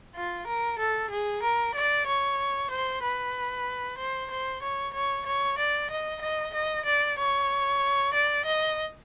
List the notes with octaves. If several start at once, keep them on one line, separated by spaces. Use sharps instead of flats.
F4
A#4
A4
G#4
A#4
D5
C#5
C5
B4
C5
C5
C#5
C#5
C#5
D5
D#5
D#5
D#5
D5
C#5
D5
D#5